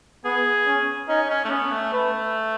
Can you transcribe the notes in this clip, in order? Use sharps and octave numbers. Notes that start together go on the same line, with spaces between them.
B3 G#4
C#4
C#4 D#4
C#4
A3
B3 C#4
A3
A3 B4